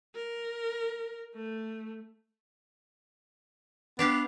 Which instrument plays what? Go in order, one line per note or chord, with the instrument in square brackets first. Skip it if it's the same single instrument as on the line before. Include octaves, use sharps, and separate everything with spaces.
[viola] A#4
A3
[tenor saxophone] B3 [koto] D4 G4 F5